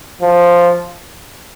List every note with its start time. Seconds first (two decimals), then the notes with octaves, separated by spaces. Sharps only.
0.21 F3